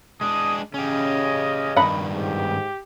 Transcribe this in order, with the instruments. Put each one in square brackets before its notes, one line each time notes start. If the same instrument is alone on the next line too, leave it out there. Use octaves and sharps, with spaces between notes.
[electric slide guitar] G#3 D4 [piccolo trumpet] D#6
[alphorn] C#3 [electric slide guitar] C#4 G4 [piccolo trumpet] D#5
[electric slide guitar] G2 D#3 [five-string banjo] F#5 B5
[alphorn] G#2 [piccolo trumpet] G4